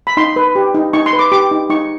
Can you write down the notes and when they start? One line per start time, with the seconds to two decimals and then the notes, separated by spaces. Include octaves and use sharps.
0.07 B5
0.17 D#4 C6
0.36 B4
0.55 G4
0.74 D#4
0.93 D#4 C#6
1.06 C6
1.13 B4
1.19 D6
1.32 G4 D6
1.51 D#4
1.70 D#4 C#6